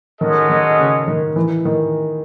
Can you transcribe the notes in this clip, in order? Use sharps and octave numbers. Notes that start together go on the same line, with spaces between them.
D#3 G#3 C#4 F#4 A4 D#5
D#3
C#3
D#3
E3
D#3